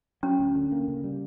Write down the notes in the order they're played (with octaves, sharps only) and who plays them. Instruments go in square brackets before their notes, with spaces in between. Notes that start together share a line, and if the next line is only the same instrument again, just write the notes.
[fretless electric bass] F#3 [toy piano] C#4
[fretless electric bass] D2
D3
A#3
C#3
G3